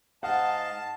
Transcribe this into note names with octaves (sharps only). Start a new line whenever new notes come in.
G#2 D#5 F5 F#5 A5